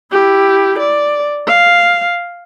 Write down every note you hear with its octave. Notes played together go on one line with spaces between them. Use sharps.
E4 G4
D5
F5